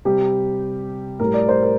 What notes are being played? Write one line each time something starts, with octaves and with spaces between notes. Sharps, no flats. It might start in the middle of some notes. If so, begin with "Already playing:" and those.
C3 G3 G4
A2 G3 A#4
D5
C5
A#4